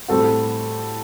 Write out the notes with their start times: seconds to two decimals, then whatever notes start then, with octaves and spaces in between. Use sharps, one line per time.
0.08 A2 G3 C4 F#4 A4